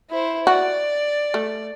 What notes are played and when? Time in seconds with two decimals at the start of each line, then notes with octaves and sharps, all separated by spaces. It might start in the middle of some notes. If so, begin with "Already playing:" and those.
0.10 E4 C5
0.47 F#4 D5
1.34 A3